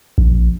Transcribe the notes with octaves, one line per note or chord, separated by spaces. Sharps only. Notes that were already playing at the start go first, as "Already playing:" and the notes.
A#1